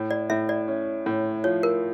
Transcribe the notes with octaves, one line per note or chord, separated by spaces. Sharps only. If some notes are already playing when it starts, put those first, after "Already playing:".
Already playing: A2
D5
A2 E5
D5
C#4
A2
F3 C#5
A#4